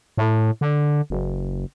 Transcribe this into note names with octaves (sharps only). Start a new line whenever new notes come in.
A2
D3
F#1